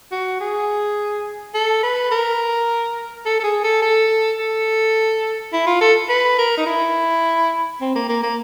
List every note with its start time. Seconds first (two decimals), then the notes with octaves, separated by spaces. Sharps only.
0.12 F#4
0.41 G#4
1.54 A4
1.83 B4
2.11 A#4
3.26 A4
3.40 A4
3.44 G#4
3.64 A4
3.82 A4
4.39 A4
5.53 E4
5.67 F4
5.81 A4
6.09 B4
6.38 A#4
6.57 D#4
6.66 E4
7.81 C4
7.96 A#3
8.09 A#3
8.23 A#3